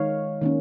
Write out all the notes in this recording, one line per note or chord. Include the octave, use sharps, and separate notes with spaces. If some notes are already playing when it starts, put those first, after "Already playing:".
Already playing: D#3 G#3 D#4 C#5 F5
D#3 A#3 C#4